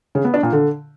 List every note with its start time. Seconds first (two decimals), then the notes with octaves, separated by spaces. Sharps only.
0.15 C#3
0.24 B3
0.34 D4
0.43 A#2
0.52 D3